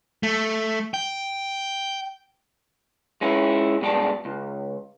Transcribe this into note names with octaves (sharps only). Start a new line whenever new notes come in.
A3
G5
G#3 C#4 E4
G2 B2 G#3 F#4 D5 A5
C#2